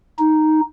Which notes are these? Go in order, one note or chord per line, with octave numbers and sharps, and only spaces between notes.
D#4